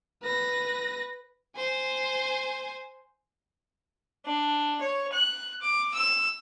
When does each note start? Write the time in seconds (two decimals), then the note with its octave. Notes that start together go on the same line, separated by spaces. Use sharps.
0.23 B4 A#6
1.56 C5 G#5
4.26 D4
4.81 C#5
5.13 F#6
5.62 D6
5.94 E6